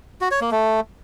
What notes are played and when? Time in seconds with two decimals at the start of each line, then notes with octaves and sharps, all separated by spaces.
0.21 F#4
0.31 C#5
0.41 A#3
0.51 A3